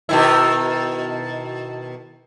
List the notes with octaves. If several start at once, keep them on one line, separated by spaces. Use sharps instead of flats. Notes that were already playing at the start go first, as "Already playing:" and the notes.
B2 D#3 E4